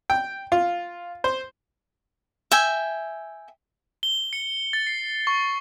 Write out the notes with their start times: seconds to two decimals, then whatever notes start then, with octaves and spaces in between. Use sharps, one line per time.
0.10 G5
0.52 F4
1.24 C5
2.51 E5 G5 G#5
4.03 G7
4.33 C#7
4.73 A6
4.87 C7
5.27 C#6